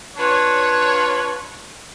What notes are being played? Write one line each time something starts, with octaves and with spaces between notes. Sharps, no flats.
D4 F4 B4 C#5